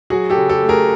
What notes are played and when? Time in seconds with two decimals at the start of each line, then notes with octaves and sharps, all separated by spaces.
0.10 F#3 F#4 G#4
0.30 G4 A4
0.36 C#3
0.49 G4 A4
0.63 A3
0.69 G#4 A#4